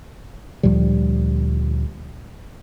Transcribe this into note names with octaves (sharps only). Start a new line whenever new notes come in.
D2 A#2 F3 G3